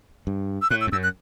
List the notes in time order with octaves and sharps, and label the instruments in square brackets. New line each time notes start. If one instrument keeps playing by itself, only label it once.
[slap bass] G2
[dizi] E6
[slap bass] A2 [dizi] F#6
[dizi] E6
[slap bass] E2
[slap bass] F#2 [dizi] E6
[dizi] F#6